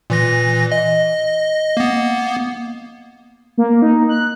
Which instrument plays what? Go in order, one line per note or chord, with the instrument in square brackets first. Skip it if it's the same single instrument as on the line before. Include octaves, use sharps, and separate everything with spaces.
[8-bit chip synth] A#2 E3 A#6
D#5
A#3 B3
[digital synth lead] A#3
D#4
F#6